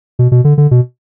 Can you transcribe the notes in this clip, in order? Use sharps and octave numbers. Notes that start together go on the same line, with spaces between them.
B2
B2
D3
D3
B2